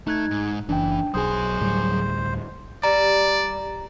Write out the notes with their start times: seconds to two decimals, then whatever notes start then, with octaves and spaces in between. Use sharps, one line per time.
0.07 A3 D#4 F#6 G#6
0.31 G#2
0.69 F#1 E3 D4 G5
1.14 B1 F#3 G#4 C5 G#5 D#6
1.61 D2 A2 G3
2.83 G3 D5 A#5